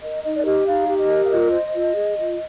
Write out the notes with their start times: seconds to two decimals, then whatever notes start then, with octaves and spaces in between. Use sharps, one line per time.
0.03 A#4 D#5
0.23 D#4 D#5
0.35 D5
0.45 G4 D#5
0.66 D#4 F5
0.88 G4
0.98 D#5
1.09 A#4
1.25 F5
1.30 F4 D#5
1.52 C5
1.73 F4
1.94 G#4
2.15 F4